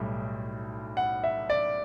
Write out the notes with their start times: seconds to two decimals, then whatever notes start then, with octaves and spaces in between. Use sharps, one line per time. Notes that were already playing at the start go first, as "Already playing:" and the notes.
Already playing: B1 A2 G3
0.97 F#5
1.24 E5
1.50 D5